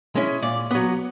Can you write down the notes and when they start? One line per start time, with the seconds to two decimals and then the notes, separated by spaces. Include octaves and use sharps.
0.15 G#3 C#4 E4
0.42 A#2 D5
0.71 F#3 B3